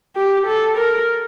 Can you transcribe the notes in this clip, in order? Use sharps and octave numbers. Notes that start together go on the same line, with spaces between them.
G4
A4
A#4